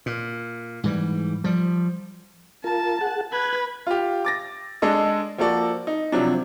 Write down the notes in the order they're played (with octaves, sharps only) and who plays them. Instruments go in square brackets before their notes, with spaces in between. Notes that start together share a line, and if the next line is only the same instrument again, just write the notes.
[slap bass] A#2
G#2 E3 G3
F3 G3
[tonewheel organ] F4 A#4 [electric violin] A5
[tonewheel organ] G#4 F#5
[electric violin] B4 [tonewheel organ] F#6 G#6
[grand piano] F4 G4
D6 A6 A#6
G#3 D4 A4 D#5
F3 A#3 F#4 A4 D5
D#4
C3 F3 F#3 D4